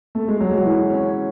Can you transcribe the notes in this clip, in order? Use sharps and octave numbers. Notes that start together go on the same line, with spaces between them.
A3
G#3
F#3
G#3
F#3
E3
C#4